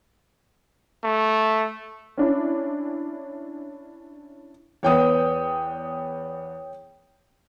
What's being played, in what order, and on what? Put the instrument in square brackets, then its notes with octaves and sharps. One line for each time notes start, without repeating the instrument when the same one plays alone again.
[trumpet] A3
[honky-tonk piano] C#4 D4 E4
[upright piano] E2 B3 [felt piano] C#5 G5 D#6